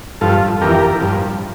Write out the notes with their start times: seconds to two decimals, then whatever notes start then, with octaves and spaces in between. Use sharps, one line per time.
0.21 G2 F3 F4 A4
0.62 F2 E3 G4 A#4
1.01 G2 F3